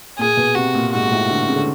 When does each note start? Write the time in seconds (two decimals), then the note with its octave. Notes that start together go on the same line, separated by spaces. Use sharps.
0.19 A#2 G#4
0.37 B2
0.55 C3 F#4
0.75 A#2
0.92 G#2 F#4
1.12 A2
1.30 D3
1.49 C#3
1.56 D3